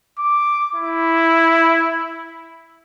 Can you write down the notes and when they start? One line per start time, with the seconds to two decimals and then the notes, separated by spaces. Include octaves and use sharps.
0.19 D6
0.75 E4